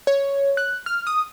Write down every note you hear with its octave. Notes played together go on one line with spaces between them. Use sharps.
C#5
F#6
F6
D#6